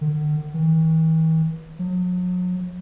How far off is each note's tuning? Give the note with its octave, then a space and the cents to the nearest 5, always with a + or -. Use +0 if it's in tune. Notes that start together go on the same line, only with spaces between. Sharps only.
D3 +45
E3 -45
F#3 -40